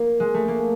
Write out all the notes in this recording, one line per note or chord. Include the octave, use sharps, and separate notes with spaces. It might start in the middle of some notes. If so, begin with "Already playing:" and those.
Already playing: A#3
G#3
A3
A#3